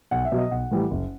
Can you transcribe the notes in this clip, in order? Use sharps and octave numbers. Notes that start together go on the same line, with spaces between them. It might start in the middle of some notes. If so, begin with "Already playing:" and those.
B1 F#5
E5
B2 F#3
D#5
B1 F#5
A2 E3 G3
F#1